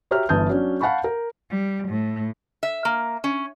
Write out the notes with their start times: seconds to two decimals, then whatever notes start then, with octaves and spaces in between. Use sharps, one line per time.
0.11 F#4 G4 C#5 E5 A#5 F6
0.29 G1 E3 A5 D#6 G6
0.49 F#3 C#4 D4
0.81 F5 F#5 A5 B5 C#6
1.04 A#4
1.50 G3
1.89 A2
2.63 E5
2.85 A#3
3.24 C#4